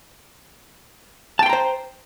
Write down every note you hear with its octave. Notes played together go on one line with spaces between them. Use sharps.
C5 G5 A5 A#5 C6